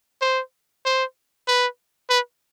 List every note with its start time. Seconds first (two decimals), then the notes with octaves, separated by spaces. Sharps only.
0.22 C5
0.85 C5
1.48 B4
2.10 B4